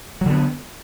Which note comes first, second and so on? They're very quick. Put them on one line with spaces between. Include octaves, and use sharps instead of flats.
F#3 D3 B3